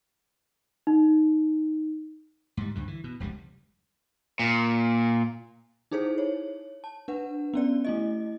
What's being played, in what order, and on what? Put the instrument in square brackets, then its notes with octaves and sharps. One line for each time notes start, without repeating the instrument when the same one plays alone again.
[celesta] D#4
[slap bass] G#2 G3
D2 G2 D3
E3
B2
F1 C#2 B2 G3
[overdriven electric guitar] A#2
[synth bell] D#4 E4 G#4 A4 C5
C#5
A5
D4 B4 F#5
B3 C#4 D5
A3 E4 D#5